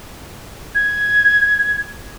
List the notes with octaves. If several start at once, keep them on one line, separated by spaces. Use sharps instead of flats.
G#6